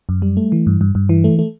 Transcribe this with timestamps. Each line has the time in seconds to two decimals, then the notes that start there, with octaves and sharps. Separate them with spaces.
0.09 F#2
0.22 G3
0.37 A3
0.52 E3
0.67 G2
0.81 G2
0.95 G2
1.09 E3
1.24 A3
1.39 A3